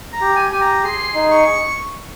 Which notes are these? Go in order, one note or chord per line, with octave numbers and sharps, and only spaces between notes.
A#5
G4
G#5
G4 G#5
A#5
G#4 C6
D#4
C#6